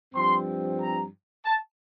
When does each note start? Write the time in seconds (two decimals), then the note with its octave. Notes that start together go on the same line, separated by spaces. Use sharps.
0.15 G2 F3 C4 C6
0.80 A#5
1.45 A5